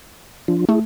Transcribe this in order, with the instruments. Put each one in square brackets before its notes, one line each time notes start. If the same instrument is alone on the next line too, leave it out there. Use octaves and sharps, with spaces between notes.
[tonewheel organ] F3 D4 F4
[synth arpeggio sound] A3 [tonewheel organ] E4 G#4